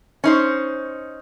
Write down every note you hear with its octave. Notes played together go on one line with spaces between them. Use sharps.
C#4 D#4 C5